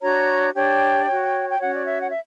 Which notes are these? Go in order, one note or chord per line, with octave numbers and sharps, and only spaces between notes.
D4 F#4 C#5 A#5
D4 G4 C#5 G5
F#4 C#5
G5
C#4 F#4 C#5 F#5
D5
E5
F#5
E5